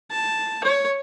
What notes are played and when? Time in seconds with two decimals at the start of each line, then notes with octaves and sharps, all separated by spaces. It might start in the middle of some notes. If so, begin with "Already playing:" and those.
0.11 A5
0.64 C#5